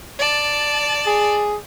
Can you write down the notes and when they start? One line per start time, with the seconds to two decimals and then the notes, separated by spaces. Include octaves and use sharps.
0.19 D5 A5
1.06 G#4